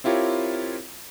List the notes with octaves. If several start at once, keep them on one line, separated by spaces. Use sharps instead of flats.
C4 E4 F4 G4 A#4 C#5